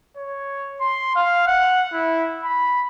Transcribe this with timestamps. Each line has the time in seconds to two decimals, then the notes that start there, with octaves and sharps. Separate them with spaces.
0.17 C#5
0.81 C6
1.16 F5
1.47 F#5
1.93 E4
2.45 B5